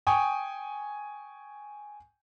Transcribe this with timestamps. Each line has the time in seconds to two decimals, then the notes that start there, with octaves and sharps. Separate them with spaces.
0.07 G5 G#5 C#6 D#6